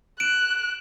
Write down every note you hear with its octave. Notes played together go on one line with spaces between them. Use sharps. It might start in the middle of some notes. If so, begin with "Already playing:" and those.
F#6 D7 E7